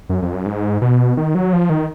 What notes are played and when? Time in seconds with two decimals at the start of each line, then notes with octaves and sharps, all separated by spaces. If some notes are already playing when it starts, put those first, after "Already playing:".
0.09 F#2
0.22 F2
0.33 F#2
0.46 G#2
0.82 B2
1.17 D#3
1.35 F#3
1.53 F3
1.70 D#3